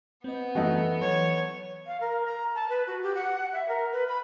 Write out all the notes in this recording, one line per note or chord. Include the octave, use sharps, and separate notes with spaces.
B3 C4 D#5
E3 A3 D#4 F#4
E3 F#3 C#5 A5
F5
A#4
A#5
A5
B4
F#4
G4
F#5
E5
A#4
B4
B5